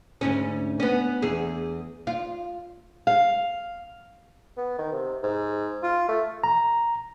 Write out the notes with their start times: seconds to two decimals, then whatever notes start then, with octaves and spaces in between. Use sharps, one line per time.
0.21 D2 G#2 C#4
0.80 B3 C#4
1.22 E2 G#4
2.07 F4
3.07 F5
4.57 B3
4.78 D#3
4.92 C3
5.23 G#2
5.83 F4
6.09 A3
6.44 A#5